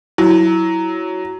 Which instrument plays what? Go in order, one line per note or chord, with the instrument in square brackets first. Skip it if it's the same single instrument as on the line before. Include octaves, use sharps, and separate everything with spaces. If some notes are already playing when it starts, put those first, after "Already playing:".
[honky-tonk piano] F#3 [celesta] E4